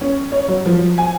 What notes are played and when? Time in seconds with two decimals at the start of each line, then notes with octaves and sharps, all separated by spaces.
0.01 C#4
0.32 C#5
0.48 F#3
0.66 F3
0.98 G#5